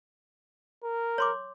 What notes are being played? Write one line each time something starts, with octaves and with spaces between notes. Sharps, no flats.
A#4
C#5 C6 D6